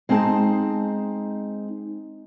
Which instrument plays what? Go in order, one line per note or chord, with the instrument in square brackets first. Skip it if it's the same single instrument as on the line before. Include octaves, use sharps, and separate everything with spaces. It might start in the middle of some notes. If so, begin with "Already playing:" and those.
[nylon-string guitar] G#3 C4 D#4 G#4 A5